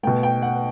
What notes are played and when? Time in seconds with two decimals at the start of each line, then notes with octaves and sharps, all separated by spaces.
0.03 B2 A3 G5
0.23 G5
0.42 F#5